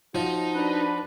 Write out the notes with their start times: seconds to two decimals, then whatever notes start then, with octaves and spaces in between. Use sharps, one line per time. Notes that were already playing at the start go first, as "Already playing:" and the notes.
0.15 F3 D#4 F#4
0.55 D4 B4